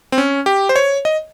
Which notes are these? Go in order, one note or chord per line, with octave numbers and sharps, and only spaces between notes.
C4
C#4
G4
C5
C#5
D#5